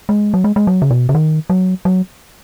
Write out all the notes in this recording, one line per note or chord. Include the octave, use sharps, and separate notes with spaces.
G#3
F#3
G#3
G#3
F#3
C#3
B2
C#3
D#3
F#3
F#3